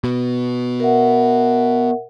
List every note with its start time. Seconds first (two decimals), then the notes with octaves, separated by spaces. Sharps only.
0.04 B2
0.80 A#4 E5 F#5